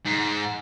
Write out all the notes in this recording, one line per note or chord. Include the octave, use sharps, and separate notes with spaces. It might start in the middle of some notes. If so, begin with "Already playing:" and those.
G#2